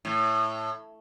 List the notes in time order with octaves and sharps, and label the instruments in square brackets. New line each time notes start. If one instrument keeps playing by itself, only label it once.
[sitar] A2